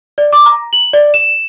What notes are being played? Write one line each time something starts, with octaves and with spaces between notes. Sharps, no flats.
D5
D6
A#5
F#7
D5
E7